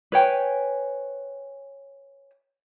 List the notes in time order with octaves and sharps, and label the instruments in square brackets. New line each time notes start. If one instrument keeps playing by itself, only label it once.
[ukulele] B4 C#5 G5 G#5